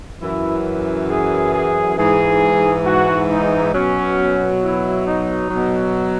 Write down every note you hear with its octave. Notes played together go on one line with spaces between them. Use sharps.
F#2 E3 E4
G#4
G#4
G#2 E3 G#4
F#4
D#4
B2 F#3 C#4
E4
D#4
B2 F#3